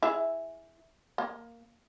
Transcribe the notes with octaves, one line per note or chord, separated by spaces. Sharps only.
E4 G#4 E5
A#3